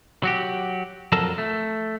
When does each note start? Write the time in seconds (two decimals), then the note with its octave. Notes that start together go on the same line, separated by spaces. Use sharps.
0.23 F#3 F#4 G4
1.12 F2 F#3 A4 A#4 A5
1.38 A3